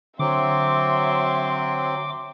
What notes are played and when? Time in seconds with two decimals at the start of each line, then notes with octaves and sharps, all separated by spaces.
0.19 D3 F#3 C4 E5 C6 D6